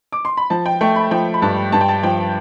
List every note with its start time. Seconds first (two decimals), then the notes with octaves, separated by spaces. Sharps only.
0.12 D6
0.25 C6
0.37 B5
0.50 F3 A5
0.66 G5
0.81 A3 G5
0.96 B5
1.11 F3 G5
1.34 B5
1.42 G2 A5
1.72 G2 A5
1.81 G5
1.89 A5
2.03 F3 G5